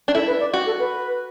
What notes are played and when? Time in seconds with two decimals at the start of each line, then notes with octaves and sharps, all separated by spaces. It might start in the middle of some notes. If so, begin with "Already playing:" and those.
0.08 D4
0.14 E4 A4
0.27 B4
0.40 D5
0.53 F#4
0.66 A4
0.79 B4